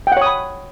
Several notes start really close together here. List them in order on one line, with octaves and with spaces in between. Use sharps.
G5 F#5 C#5 D#6 B5